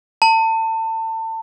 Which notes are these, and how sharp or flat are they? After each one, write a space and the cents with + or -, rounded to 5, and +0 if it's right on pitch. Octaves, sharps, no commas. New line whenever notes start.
A5 +30